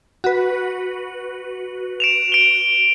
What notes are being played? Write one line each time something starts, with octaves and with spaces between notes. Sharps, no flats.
F#4 B4
D7 E7 F7
D7 G7